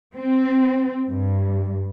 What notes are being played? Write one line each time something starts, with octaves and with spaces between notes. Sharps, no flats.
C4
G2